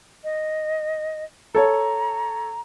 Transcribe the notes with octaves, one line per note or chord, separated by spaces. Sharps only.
D#5
A4 C#5 A#5